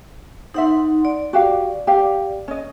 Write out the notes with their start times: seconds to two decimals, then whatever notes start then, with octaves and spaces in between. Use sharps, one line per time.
0.54 D#4 C5 E5 F#5 C6
1.05 D5
1.33 F#4 G4 F5
1.87 G4 F5
2.48 C#4 D#5